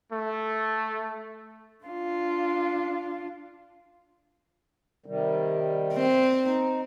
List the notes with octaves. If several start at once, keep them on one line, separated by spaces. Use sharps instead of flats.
A3
D4 F4
C3 D#3 G3
C4
D#4